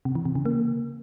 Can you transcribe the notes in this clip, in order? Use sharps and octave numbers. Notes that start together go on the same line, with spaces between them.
C3
E3
C3
C#3
A#3